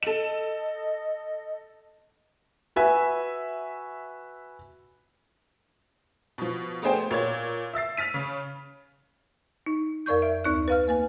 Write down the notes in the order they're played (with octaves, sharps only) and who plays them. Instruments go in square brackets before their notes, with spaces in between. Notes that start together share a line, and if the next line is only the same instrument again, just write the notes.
[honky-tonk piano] A4 E7 [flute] D#5
[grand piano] F#4 B4 E5 G#5
[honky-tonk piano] B2 F3
A3 B3 D4 G#4 C5 G5
A#2 C#5 G#6
E5 E6 A6 C7
F6 A6 B6 D#7
C#3
[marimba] D#4
F2 A#4 D5 C#6 G6
E5
D2 D#4 F#6
B4 F5 F6
A#3 B4 G#5